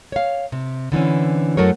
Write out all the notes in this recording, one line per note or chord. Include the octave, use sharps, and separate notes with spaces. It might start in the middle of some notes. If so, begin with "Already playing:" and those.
C#5 F5
C3
D3 E3 C4 C#4
F#2 F#3 A3 A#4 C#5